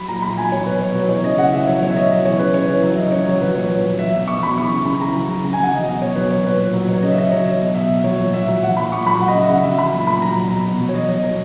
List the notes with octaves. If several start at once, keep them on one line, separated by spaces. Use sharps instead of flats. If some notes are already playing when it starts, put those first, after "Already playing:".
Already playing: F#3 B5
A#2 A#5
A#2 B5
F#3 G#5
F#3 C#5
B2 B4
B2 C#5
F#3
E3 C#5
C#3 D#5
C#3 F#5
E3 E5
F#3 C#5
B2 C#5
E5
B2 D#5
F#3
E3 C#5
C#3 B4
C#3 C#5
E3
F#3 E5
C#3 D#5
C#3 C#5
F#3
F#3 B4
A#2 C#5
A#2
F#3
F#3 E5
B2 E5
B2 C#6
F#3 B5
E3 C#6
C#3
C#3 B5
E3 A#5
F#3
C#3
C#3 A#5
G#5
F#3 F#5
F#3 D#5
B2 D#5
B2 C#5
F#3 B4
F#3 C#5
A#2 B4
A#2 B4
F#3
F#3 C#5
C#3 D#5
E5
C#3 D#5
F#3 C#5
F#3 D#5
B2
B2 E5
F#3
F#3 C#5
A#2
A#2 E5
F#3
F#3 F#5
A#2 B5
A#2 C#6
F#3 B5
F#3 F#5
D#5
C#3 E5
C#3 F#5
F#3 E5
F#3 B5
A#2
A#2 B5
F#3 A#5
F#3
B2
B2
F#3
C#5
F#3 D#5
B2 D#5
B2 C#5